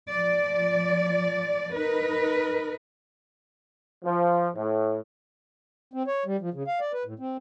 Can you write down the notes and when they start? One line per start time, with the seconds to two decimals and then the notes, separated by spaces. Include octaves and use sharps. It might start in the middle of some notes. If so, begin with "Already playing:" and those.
0.11 F3 D5
1.76 D#4 A#4 B4
4.05 F3
4.56 A2
5.93 C4
6.07 C#5
6.26 G3
6.41 F3
6.54 C#3
6.67 F5
6.80 D5
6.93 B4
7.05 A2
7.19 C4